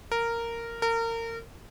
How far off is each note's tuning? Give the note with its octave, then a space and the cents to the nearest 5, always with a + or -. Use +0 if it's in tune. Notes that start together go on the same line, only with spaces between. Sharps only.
A#4 -10
A#4 -30